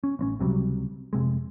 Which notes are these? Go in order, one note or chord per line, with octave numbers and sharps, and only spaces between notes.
C#4
A1 C4 C#4
C#2 C3 F#3 G3
F1 C3 G#3